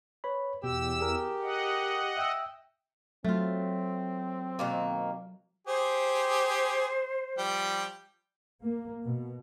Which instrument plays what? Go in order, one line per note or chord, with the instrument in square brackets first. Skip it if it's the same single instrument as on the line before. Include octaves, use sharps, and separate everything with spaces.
[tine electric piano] B4 C#5 B5
[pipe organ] E2 E6 [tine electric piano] B2 [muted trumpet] G4
[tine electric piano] G#4 A#4
[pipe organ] D#5 F#5
[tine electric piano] E5 G5 E6
[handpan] F#3 [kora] A3 F4 [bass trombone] C4
[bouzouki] B2 D#3 A#3
[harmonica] G4 G#4 [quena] C5
[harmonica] F3 G3 G5
[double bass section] A#3
B2